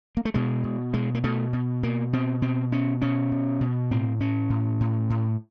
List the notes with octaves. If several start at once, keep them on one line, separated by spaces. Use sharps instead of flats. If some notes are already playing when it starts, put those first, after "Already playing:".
A#3
A3
B2 G#3
B2
B2 G#3
A#3
B2 A3
B2
B2 A#3
B2 C4
B2 C4
B2 C#4
B2 C#4
B2
B2
A2 C4
A2 C#4
A2
A2
A2